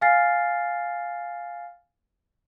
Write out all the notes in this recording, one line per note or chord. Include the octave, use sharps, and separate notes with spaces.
F5 G#5 F6 A6 C7